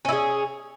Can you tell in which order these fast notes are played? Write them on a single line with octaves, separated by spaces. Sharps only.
C#4 E4 G#4